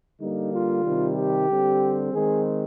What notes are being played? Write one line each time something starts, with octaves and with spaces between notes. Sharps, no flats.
D3 G3 A#3 D#4
F4
C3 D#3 G3
G4
D3 G3 C4
D#3 G#3 C4 G#4